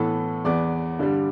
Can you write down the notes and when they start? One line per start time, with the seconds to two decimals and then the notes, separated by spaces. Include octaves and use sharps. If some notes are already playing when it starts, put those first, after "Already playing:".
Already playing: A2 E3 B3 A4 A5
0.45 E2 E3 B3 D5 D6
0.99 G2 D3 G3